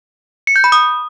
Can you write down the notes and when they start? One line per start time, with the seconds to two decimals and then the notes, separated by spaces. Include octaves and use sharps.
0.47 C#7
0.56 G6
0.64 B5
0.72 D#6